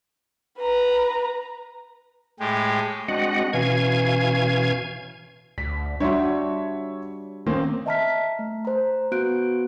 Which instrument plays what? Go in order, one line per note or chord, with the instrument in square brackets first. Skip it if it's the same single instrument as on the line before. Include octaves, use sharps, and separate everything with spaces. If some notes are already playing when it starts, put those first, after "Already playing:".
[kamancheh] B4 A#5
[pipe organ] A2 G#3 G4
[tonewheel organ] G#3 C4 D4 F#4 D#5 F#5
B2 E3 C#4 F5 G#5 G#6
[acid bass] D2 [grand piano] B6
[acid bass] G3 [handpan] D4 F#4 [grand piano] C#5 E5 C6
[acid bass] D#3 [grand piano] A#3 C4 C#4
[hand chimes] D#5 E5 A5 A#5 F6 B6
A3
C5 A#5
B3 F#4 F#6 G6 D7